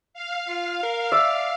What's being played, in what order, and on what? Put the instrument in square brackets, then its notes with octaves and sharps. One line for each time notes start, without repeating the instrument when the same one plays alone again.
[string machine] F5
[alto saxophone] F4
A#4
[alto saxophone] D5 [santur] E5